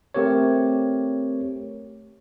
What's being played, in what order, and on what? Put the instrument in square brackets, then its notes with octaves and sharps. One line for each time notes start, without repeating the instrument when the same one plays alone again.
[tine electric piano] A3 C4 G4 A#4 C#5